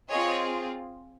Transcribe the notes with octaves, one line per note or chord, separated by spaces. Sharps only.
C4 F4 G#4 C#5 D#5